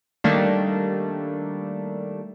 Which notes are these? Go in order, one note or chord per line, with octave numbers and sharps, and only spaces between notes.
D#3 G3 A3 A#3 D4